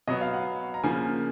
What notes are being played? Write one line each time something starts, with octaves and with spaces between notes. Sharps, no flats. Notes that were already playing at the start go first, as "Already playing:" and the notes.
B2 F#3 B3 D#5
F5
F#5
A#5
C#3 F3 A#3 G#5